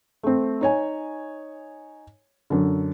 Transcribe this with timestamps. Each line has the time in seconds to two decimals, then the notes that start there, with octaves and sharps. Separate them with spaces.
0.23 A3 C4
0.61 D#4 C#5 G#5
2.50 F#2 D3